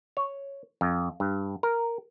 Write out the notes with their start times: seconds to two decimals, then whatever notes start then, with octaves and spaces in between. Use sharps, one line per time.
0.17 C#5
0.81 F2
1.20 G2
1.63 A#4